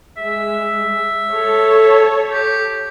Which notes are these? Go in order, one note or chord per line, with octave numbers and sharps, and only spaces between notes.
G#3 E5
A4 C#5
G4